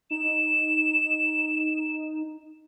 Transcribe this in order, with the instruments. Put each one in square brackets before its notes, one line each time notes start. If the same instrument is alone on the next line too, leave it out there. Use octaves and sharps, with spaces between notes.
[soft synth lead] D#4 [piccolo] E7